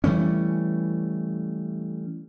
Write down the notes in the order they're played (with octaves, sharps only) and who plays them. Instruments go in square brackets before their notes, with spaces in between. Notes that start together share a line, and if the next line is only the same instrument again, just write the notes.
[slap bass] E3 G3 A3 C#4